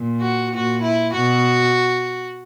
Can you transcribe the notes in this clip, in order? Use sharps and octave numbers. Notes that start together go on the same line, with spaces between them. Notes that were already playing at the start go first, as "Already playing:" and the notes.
Already playing: A#2
F#4
A#2 F#4
E4
B2 F#4